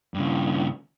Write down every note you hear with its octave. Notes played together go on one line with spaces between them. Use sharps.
G2 C#3